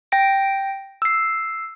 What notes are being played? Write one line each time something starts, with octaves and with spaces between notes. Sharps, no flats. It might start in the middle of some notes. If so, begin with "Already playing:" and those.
G5 A#6 D7
E6 C7